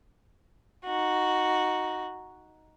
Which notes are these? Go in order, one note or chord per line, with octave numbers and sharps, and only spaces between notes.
D#4 F#4